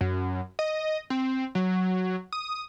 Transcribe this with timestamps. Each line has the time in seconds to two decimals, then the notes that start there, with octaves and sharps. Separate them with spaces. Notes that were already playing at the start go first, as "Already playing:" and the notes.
0.01 F#2
0.59 D#5
1.10 C4
1.55 F#3
2.33 D#6